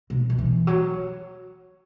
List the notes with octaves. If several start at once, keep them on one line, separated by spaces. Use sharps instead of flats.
B2
D#3
E3
F#3